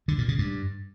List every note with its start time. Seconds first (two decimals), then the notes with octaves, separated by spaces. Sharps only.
0.08 D3
0.18 A#2
0.28 C#3
0.39 G2